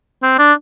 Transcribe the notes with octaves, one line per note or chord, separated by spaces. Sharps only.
C4
D4